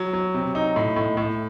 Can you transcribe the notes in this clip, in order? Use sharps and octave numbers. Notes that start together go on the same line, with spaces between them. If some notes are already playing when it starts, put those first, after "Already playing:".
Already playing: F#3
F#3
C3
D#4
A2
A2
A2